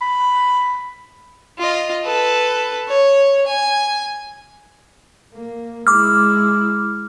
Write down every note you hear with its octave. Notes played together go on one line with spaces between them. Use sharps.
B5
F4 D#5
A4 B4
C#5
G#5
A#3
G#3 E4 D6 F6